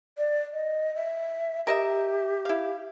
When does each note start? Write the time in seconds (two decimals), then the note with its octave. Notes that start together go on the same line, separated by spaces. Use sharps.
0.18 D5
0.53 D#5
0.96 E5
1.67 G4 A#4 D#5 E5
2.45 E4 F5